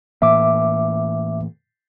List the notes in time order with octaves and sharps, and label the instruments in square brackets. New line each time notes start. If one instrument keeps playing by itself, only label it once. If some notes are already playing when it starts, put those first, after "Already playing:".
[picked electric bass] A2 E3 A#3 [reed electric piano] E5 D6